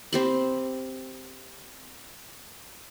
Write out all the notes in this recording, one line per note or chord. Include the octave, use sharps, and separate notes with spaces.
C4 G4 B5